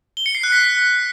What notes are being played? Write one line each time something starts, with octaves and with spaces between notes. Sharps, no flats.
G7
C#7
C7
F#6
B6